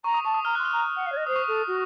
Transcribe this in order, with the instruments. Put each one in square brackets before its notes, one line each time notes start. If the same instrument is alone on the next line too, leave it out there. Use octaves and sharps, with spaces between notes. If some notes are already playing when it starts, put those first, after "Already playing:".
[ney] A#5 [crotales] C#6
[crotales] D#6
[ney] A5 [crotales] C#6
[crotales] D#6
[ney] A#5 [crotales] F6
[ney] C6 [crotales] F#6
[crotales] F6
[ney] A#5
F#5
F5
C#5
D#5
[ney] C5 [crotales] D#6
[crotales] C#6
[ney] A4 [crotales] D#6
[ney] F#4